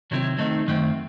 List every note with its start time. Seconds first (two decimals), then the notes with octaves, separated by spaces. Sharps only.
0.11 C3 D#3 F#3 C4 E4
0.38 D#3 A3 C4 D#4
0.67 F#2 D#3 A3 C4